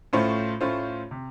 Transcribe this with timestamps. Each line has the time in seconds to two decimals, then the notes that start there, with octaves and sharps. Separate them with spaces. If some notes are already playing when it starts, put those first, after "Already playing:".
0.13 A2 A3 C#4 F4 C5
0.61 A2 A3 C#4 F4 C5
1.11 C3